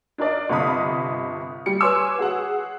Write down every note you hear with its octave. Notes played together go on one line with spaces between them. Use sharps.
D4 D#4 A#4 D5 D#5
G1 C3 D#5 B5 D#6
G3 C#7
B4 C#5 G#5 C6 D6 E6
F#4 G#4 F#5